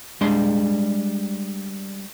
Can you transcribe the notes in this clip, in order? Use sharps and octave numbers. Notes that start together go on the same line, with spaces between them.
G3 G#3 D4 G#4 C6